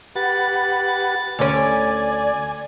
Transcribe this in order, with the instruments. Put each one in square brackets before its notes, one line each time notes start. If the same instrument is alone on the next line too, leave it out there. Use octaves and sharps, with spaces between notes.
[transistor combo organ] G4 B4 F#5 [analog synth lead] A6
[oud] D2 C#4 [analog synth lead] D5 [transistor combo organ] G#5